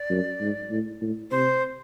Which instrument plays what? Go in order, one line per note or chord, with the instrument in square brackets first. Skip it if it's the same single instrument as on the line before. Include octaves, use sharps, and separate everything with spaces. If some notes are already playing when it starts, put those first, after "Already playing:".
Already playing: [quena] D5
[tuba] F#2
G#2
A2
A2
[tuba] C3 [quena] C5